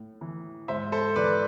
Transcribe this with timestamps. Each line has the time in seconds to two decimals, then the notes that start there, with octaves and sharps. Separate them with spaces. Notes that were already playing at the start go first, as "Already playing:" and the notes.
Already playing: A2
0.21 E3
0.68 G#2 C5 E5
0.92 A4 C5
1.16 E3 B4 D5